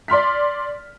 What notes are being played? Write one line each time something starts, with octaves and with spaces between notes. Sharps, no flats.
D5 C6 F6 B6